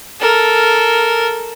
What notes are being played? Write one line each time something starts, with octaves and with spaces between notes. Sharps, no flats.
A4 A#4